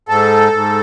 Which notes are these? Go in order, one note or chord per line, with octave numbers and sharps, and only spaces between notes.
G#2 A4
G#2